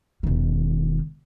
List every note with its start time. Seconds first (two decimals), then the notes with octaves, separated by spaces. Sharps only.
0.23 E1 D#3